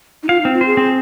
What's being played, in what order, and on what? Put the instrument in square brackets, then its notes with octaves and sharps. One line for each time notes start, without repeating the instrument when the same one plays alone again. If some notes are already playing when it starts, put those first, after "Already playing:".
[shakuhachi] D#4
[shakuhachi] F4 [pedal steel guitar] F5
[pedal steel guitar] C4 [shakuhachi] D#4
[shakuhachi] F4
[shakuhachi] G#4 [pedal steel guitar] C5
[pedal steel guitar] C4